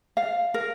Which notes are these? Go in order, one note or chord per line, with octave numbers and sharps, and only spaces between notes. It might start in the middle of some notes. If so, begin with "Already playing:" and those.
F5
A#4